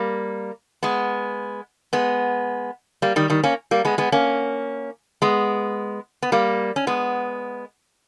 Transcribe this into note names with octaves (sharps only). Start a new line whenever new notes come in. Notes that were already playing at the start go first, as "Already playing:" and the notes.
Already playing: G3 A#3
G#3 B3
G#3 B3
G3 A#3
D#3 G3
D#3 G3
A#3 C#4
G3 A#3
G#3 B3
G#3 B3
A#3 C#4
G#3 B3
B3
G3 A#3
C#4
G#3 B3